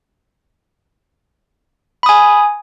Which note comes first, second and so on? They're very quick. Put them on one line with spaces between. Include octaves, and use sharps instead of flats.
B5 D#6 G#5